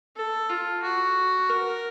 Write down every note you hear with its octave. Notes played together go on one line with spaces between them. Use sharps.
A4
F4
F#4
A#4